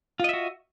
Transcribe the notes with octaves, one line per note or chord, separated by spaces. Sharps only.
F4 F#4 D#5 E5